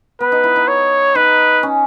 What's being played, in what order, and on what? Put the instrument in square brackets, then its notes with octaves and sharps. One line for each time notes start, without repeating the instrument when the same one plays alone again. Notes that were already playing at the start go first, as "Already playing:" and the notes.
[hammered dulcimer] B3 [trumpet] B4
[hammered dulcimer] D#4
E4
D#4
[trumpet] C#5
[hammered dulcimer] D#4 [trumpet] B4
[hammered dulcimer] C#4